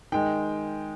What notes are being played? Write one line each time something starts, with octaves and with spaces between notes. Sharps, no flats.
D#3 G#3 G5